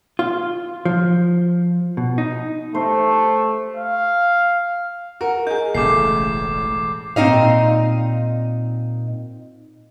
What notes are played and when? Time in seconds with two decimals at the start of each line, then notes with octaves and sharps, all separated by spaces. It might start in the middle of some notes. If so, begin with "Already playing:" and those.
0.19 F4
0.85 F3
1.97 B2
2.18 D#4
2.75 A3 C5
3.77 F5
5.21 F#4 A#4
5.47 D#4 G#4 G6
5.75 E1 A1 A2 C#3 G#3 A3 D6 C7
7.16 A#2 C4 D#4 D#5 F5